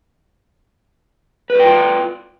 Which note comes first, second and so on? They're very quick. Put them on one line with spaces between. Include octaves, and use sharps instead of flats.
B4 D5 G5 F4